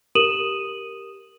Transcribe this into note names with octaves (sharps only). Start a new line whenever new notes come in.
G4 A#4 D#6 D#7 E7 F#7